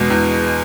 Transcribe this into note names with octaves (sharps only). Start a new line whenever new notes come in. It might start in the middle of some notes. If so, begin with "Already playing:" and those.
Already playing: E2 B2 G#3
E2